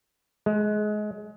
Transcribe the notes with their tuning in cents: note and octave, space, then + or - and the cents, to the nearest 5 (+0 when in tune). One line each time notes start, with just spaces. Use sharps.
G#3 +25